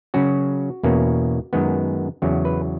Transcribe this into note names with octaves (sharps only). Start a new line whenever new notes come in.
C#3 F#3 C#4 F#4
E2 B2 A#3 C#4
F#2 D#3 G#3 B3
E2 C#3 F#3
B4